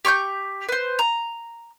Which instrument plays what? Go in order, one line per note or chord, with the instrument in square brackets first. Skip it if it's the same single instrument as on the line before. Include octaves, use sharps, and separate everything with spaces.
[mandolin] G4 C#6 F6 G6
B4 C5
A#5